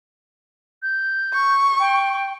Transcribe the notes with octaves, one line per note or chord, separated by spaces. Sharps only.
G6
C#6
G5